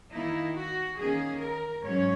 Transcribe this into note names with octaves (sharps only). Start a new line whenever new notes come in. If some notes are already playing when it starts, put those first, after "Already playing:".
D#3 A#3 D#4 E4
F#4
D#3 A#3 C#4 G#4
A#4
G#2 F#3 C#4 C#5